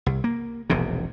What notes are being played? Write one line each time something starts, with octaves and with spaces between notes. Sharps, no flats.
C2
A#3
E1 A#1 G#2 C3